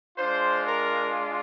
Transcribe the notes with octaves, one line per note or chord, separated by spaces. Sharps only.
G#3 D4 F4 C5
A#4